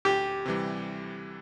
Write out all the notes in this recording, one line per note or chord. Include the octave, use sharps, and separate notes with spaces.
D2 G4
C3 E3 G3